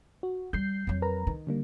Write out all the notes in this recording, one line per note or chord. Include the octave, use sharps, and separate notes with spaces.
F#4
G3 G6 C7
F2 F#3
A#4 B4 A#5
D#3
D3 G3 A#3